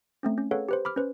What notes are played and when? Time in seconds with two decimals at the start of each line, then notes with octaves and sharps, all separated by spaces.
0.23 A3 C4 C#4
0.38 C#4
0.51 G#4 A4 B4 C#5 F5 F#5
0.69 G4 B4 C5
0.85 B5 D6 F6
0.96 C#4 B4 C5